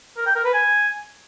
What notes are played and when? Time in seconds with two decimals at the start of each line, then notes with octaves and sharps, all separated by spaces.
0.17 A#4
0.26 G5
0.35 A#4
0.44 B4
0.54 G#5